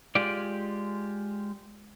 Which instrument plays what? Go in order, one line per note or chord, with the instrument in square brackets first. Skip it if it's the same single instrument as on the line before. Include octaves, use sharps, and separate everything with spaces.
[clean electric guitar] G#3 F4 G4 D5